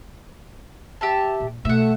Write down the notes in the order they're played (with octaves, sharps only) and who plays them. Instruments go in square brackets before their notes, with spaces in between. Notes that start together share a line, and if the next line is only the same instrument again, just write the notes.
[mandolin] G4 E5 A5
[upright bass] A#2
[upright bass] B2 [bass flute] A3 [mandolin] E5 F#5